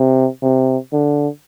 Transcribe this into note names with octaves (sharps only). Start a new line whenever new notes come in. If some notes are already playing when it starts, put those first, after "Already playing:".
Already playing: C3
C3
D3